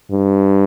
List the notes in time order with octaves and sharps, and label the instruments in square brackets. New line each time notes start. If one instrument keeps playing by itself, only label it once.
[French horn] G2